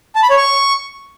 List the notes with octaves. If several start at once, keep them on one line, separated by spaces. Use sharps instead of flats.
A5
B5
C#5
C#6